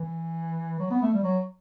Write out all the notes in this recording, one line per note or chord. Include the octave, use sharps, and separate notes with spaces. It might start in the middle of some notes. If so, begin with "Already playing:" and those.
Already playing: E3
F#3
B3
A3
G3
F#3